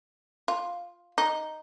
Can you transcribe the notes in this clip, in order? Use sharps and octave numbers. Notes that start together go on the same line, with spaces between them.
F4
D#4